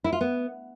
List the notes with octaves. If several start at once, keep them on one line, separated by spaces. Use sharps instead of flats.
E4
F4
B3